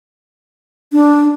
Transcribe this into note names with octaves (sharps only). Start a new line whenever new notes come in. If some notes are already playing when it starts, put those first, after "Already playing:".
D4